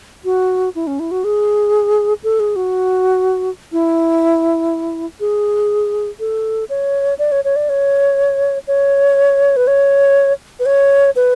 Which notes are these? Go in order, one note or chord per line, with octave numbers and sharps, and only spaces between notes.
F#4
E4
C#4
E4
F#4
G#4
A4
G#4
F#4
E4
G#4
A4
C#5
D5
C#5
C#5
D5
C#5
C#5
B4
C#5
B4
C#5
B4